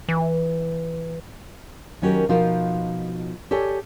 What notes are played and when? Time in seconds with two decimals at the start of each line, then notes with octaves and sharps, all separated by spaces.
0.09 E3
2.02 D#3 F#3 C#4 F#4 G4 A#4
2.29 B2 F3 D#4 F4 F#4 A#4
3.51 G4 A4 C#5 D5 G#5